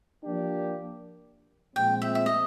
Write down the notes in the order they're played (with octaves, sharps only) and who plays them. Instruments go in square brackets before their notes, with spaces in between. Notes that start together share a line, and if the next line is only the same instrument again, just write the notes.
[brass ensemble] F3 A#3 D4 G4
[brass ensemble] A#2 F3 G#3 C4 [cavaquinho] G5
[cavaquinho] E5
E5
D#5